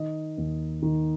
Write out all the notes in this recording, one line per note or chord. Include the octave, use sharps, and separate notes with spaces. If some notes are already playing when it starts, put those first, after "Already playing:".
Already playing: D#3 D#5
D#2
D#3